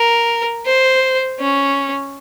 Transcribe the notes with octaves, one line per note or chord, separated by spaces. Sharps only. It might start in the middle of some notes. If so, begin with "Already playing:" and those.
Already playing: A#4
C5
C#4